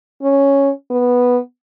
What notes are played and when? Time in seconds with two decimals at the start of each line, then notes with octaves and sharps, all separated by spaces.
0.23 C#4
0.90 B3